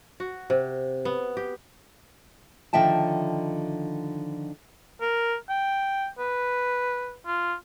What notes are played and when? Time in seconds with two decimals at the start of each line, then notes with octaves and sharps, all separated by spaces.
0.20 F#4
0.50 C3
1.05 B3
1.37 G4
2.73 D3 D#3 F3 E5 G5 A5
5.01 A#4
5.49 G5
6.19 B4
7.27 F4